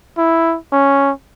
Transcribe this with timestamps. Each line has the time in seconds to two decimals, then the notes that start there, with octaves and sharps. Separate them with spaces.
0.17 E4
0.72 C#4